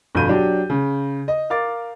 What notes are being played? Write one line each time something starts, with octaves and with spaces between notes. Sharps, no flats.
G1 F2 B2 B5 G6 D#7
F#3 D4 F#4 G4
C#3
D#5
A#4 F5 D6 A6